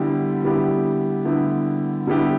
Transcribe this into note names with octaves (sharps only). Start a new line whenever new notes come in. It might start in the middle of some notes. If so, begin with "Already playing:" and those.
Already playing: D3 G3 B3 E4 G4
D3 G3 B3 E4 G4
D3 G3 B3 E4 G4
D3 G3 B3 E4 G4